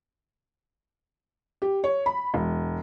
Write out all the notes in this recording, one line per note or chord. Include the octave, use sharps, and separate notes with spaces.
G4
C#5
B5
E1